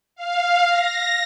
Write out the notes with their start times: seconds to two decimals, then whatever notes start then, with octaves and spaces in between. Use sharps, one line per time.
0.16 F5
0.69 A#6